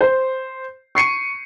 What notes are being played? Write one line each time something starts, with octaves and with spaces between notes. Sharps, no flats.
C5
C#6 C7 C#7 D#7